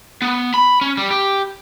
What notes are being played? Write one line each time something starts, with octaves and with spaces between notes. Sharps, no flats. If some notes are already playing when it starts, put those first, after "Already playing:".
B3
B5
C#4
G3
G4